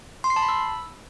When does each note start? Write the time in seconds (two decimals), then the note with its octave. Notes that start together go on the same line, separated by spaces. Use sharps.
0.24 C6
0.30 C7
0.36 A5
0.42 B5
0.49 E6